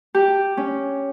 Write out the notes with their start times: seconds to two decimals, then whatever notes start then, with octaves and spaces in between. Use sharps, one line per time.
0.14 G4
0.57 C#4